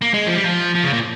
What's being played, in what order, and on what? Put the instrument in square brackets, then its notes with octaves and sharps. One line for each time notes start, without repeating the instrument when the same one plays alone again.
[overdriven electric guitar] A#3
G#3
F3
G3
F3
F3
C#3
A#2